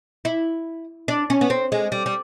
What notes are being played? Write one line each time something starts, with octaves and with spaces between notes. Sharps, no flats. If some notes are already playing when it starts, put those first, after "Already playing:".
E4
D4
C#4
B3
C4
G#3
G3
G3